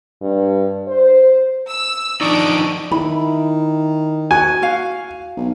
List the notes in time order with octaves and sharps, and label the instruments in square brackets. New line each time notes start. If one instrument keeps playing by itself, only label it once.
[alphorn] G2
C5
[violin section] E6
[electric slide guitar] F3 D4 D#4 [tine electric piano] D5 C#6 D#6 [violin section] D7
[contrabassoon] D#3 [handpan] E4 [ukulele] B5
[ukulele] F#4 [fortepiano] G#5
[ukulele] F#4 F5
[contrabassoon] B1